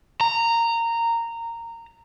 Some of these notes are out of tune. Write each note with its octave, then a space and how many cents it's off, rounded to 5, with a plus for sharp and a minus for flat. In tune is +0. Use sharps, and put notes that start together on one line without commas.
A#5 -15